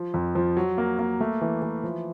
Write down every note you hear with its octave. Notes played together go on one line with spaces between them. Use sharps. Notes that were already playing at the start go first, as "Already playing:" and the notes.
Already playing: F3
F2
F3
F#3
A#3
A#3
A3
E3
E3
F3